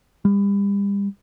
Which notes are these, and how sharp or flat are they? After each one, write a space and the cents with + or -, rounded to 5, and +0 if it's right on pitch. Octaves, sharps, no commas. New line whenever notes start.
G3 +35